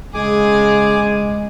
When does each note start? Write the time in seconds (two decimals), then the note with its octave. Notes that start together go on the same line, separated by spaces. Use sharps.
0.14 C#3 G#3 G#4 G#5 D6